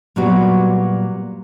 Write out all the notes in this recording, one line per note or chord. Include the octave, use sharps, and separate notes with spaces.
A#2 F#3 G3 B3 F#4